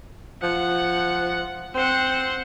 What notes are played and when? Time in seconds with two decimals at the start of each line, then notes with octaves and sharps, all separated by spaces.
0.43 F3 F#5
1.75 C4 C5 F#5